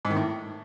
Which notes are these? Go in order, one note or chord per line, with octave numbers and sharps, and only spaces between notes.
G#2
D#3
A2